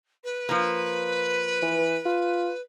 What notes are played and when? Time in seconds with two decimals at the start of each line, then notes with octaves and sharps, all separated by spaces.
0.24 B4
0.49 F3 A#3
1.62 E3
2.06 F4